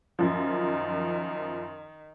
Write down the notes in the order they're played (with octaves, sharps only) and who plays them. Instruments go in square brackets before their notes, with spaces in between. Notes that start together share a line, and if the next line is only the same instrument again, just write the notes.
[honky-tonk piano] F#2 F3 [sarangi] D#3